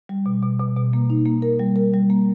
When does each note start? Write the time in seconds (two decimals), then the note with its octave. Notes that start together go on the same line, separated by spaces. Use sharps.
0.09 G3
0.26 B2
0.42 B2
0.60 B2
0.77 B2
0.93 A#3
1.10 D#4
1.26 A#3
1.42 A#4
1.59 G3
1.76 A#4
1.94 G3
2.10 A#3